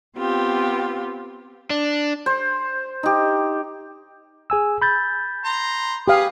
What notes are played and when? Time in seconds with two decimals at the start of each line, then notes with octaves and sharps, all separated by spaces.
0.17 B3 C4 F4 G4
1.70 D4
2.26 C5
3.03 D#4 G4
4.50 G#4 G#5 E6
4.82 B5 G6 A6
5.44 A#5 C6
6.08 G4 G#4 B4 F5 D#6